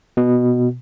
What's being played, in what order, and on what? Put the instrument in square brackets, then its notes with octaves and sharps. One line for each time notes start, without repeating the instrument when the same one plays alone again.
[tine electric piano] B2